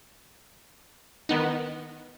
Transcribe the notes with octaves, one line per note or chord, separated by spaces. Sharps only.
D#3 B3 D#4